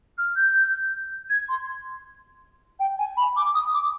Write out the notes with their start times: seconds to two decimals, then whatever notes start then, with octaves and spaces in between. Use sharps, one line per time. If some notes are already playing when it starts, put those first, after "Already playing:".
0.18 F6
0.36 G6
1.29 G#6
1.49 C6
2.79 G5
2.98 G#5
3.17 B5
3.36 D6
3.54 D#6
3.73 D6